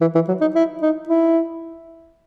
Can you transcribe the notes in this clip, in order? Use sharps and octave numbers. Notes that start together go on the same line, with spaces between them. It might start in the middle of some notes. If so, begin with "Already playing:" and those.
E3
E3
F#3
D#4
E4
D#4
E4